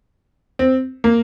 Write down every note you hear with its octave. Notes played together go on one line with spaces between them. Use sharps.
C4
A#3